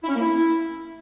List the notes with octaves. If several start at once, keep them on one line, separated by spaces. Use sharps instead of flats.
E4
C#4
A#3
E4